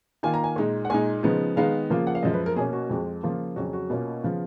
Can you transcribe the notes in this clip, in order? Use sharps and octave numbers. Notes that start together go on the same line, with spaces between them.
D#3 A#3 F4 G#5
A#5
G#5
A#2 G#3 D#4
F#5
A#2 G#3 D#4 G#5
C#3 F3 G#3 B3 D#4
D#3 G#3 B3 D#4 F5
C#3 F3 A#3 F4
F#5
F5
F#2 F3 G#3 D#5
B4
A#4
B2 A#3 C#4 G#4
F#4
F2 F3 G#3
C#3 F3 A#3 F4
F2 C#3 F#3 C#4 F#4
F#4
B2 A#3 C#4 F4
C#3 F3 B3 F4